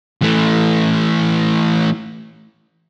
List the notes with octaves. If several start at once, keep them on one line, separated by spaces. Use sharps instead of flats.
E3 A3